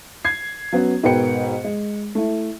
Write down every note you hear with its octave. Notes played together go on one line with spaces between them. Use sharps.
G#6 C7
F#3 B3 C#4
G#2 B2 A#4 B4 G5 C#7
G#3
A3 E4